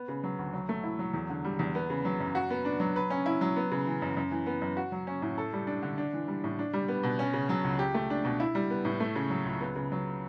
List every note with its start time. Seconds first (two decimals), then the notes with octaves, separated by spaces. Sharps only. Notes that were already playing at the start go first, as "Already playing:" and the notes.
Already playing: B3
0.08 C#3
0.24 F#3
0.39 D2
0.53 F#3
0.69 A3
0.83 E4
0.99 F#3
1.13 E2
1.30 D3
1.44 G3
1.59 E2
1.75 B3
1.90 C#3
2.05 F#3
2.20 F#2
2.35 F#4
2.50 B3
2.65 D4
2.80 F#3
2.96 B4
3.10 C#4
3.26 E4
3.41 F#3
3.56 B3
3.71 C#3
3.86 E3
4.02 F#2
4.17 F#2
4.31 E3
4.46 B3
4.62 F#2
4.77 F#4
4.92 F#3
5.07 C#4
5.22 A2
5.38 A4
5.53 G3
5.67 D4
5.82 D3
5.98 D4
6.13 E3
6.28 G3
6.44 A2
6.59 D4
6.73 G3
6.88 B3
7.03 B2
7.19 C#4
7.33 C#3
7.49 F#3
7.64 C#2
7.79 G4
7.94 A3
8.10 D4
8.25 B2
8.40 E4
8.55 G3
8.70 B3
8.85 A2
9.00 A3
9.15 C#3
9.30 F#3
9.46 C#2
9.61 B3
9.76 C#3
9.92 F#3